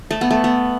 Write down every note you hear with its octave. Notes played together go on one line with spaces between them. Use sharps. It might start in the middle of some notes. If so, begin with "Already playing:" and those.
A3
B3
A3
B3